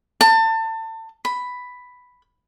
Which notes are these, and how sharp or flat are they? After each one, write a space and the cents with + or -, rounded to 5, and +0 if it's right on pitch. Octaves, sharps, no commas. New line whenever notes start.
A5 +30
B5 +5